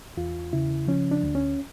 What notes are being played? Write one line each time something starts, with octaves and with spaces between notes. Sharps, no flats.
E2 F4
C#3 E4
F3 C#4
D4
D2
C#4